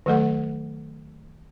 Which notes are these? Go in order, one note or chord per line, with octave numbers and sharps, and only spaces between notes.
D#3 F#3 A3 A4 F#5